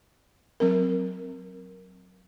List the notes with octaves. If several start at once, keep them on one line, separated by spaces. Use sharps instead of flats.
F#3 C4 A#4